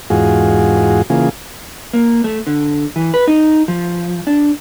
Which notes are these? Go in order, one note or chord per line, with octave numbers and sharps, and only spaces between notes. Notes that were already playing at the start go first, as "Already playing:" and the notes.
E2 G#2 F4 F#4 G#4
C#3 E3 A#3 F4 G#4
A#3
A3
D3
E3
B4
D#4
F3
D4